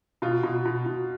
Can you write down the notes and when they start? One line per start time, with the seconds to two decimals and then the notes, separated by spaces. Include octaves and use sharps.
0.22 B2 F4
0.43 B2
0.65 B2
0.86 B2